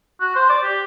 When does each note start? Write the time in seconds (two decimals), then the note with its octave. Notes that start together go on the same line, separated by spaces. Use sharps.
0.21 F#4
0.35 C5
0.49 D5
0.63 G4